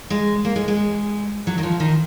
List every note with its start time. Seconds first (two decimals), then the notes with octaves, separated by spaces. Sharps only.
0.10 G#3
0.45 A#3
0.56 G#3
0.68 G#3
1.47 F#3
1.58 D#3
1.63 F3
1.80 D#3